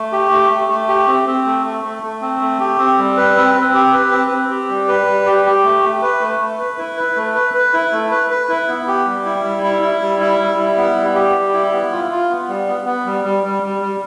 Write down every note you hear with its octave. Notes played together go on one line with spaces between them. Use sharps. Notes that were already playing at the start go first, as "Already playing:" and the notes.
Already playing: A3
G4
A3
A3
A3
G4
C4
C4
A3
A3
A3
A3
C4
A3
G4
C4
G3
B4
C4
C4
G4
B4
C4
C4
G4
G3
B4
G3
G4
G4
A3
A3
B4
A3
A3
B4
E4
B4
A3
B4
B4
E4
A3
B4
B4
E4
B3
G4
G3
E4
G3
E4
E4
G3
E4
G3
E4
B3
G3
G4
G3
E4
B3
F4
F4
B3
G3
B3
B3
G3
G3
G3
G3
G3